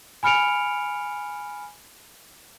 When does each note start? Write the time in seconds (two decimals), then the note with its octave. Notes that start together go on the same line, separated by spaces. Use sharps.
0.23 G#5 B5 F6 C#7 D7 F7